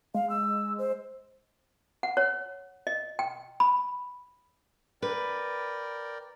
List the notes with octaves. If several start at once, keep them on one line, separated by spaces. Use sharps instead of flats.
G#3 F5
E6
C5
F#5
C#5
D#5
G5
B5
A#4 B4 D5 G5